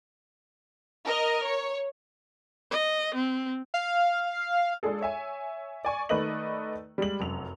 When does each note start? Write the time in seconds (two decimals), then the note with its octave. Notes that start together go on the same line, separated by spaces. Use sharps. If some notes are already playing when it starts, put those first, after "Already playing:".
1.05 A#4 D#5
1.45 C#5
2.71 D#5
3.15 C4
3.74 F5
4.83 G#3 D4 F4 G#4 A4
5.01 C#5 E5 G#5
5.85 D5 G#5 C#6
6.09 D#3 A3 B4 D5 D#5 F#7
6.98 G3 G#3 F#7
7.20 F1 F#2 F7